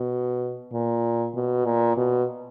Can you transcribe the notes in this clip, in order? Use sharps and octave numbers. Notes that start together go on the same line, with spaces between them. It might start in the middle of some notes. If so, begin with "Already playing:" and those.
Already playing: B2
A#2
B2
A#2
B2